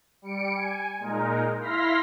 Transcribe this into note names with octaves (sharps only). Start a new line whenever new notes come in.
G3 C#7 D7
G#5
A#2 G#3 D#4 A#4
E4 F5 C6 F6 A#6 B6